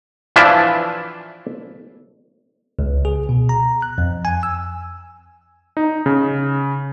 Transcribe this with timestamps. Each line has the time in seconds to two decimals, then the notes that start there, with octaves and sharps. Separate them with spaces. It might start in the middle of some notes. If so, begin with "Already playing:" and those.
0.36 E3 F3 D4 E4 F4 E5
2.79 C#2
3.05 G#4
3.29 B2
3.49 A#5
3.82 F#6
3.98 F2
4.25 G#5
4.43 E6
5.77 D#4
6.06 C#3